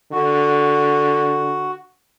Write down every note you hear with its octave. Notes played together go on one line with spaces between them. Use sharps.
D3 F#4